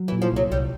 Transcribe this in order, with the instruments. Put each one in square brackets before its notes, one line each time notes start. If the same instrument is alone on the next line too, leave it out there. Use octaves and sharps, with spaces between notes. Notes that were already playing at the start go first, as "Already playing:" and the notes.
Already playing: [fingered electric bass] F#3
[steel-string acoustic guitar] E3
[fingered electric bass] A#2
[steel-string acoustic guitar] F3
[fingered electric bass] C2 [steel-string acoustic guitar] F#3
[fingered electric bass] C2 [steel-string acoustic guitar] G3